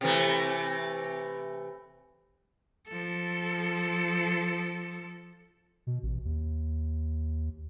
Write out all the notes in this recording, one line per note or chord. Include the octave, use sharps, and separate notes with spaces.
C3 E3 A3
F3 A4
B2
A1
D#2